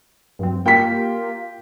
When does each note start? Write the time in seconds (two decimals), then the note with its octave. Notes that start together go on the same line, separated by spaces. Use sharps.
0.39 G2 F#3 C4
0.66 A#3 F4 G4 G5 B6